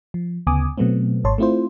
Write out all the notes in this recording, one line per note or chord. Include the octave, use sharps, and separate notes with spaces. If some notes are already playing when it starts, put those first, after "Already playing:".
F3
D2 C#3 B3 G#5 D6 D#6
B2 F#3 A3 B3 C4
G#1 G#2 C#5 A5 C6
A3 C4 E4 F4 C5